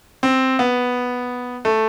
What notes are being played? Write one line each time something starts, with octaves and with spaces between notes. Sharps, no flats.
C4
B3
A3